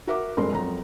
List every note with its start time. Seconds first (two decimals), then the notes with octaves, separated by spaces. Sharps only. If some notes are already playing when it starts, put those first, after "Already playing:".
0.07 F#4 A#4 E5 F#5 D6
0.37 G1 F2 G#3 A#4 C6
0.52 F2 F#3 A#5